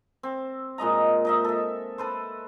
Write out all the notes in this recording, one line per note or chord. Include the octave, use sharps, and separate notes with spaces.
C4
A#2 G#3 D#5 A#5
D#4 D#5 E5
A4 E5
A4 B4 C5